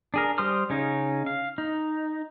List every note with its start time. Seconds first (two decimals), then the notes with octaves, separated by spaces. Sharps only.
0.14 D4 G#4 A#4
0.38 G3 C5 C6 D#6 F6
0.70 C#3 C#4 D#4
1.26 F5
1.58 D#4